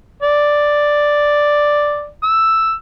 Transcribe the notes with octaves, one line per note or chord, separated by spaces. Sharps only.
D5
E6